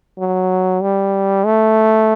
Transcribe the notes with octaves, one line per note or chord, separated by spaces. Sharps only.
F#3
G3
A3